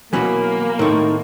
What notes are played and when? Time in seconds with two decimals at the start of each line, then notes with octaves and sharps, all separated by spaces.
0.13 B1 B2 E3 F#3 A#3 C#4 G#5 B5
0.79 A2 D#3 A3 C4 D#4 C#6